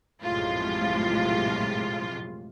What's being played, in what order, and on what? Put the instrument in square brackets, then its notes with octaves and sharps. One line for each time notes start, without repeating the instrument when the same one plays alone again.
[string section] A#1 F#2 A2 C3 G#3 F4